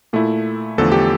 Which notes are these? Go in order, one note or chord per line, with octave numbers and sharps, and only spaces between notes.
A#2 A3 E4
E2 D3 F3 A3 A4
G4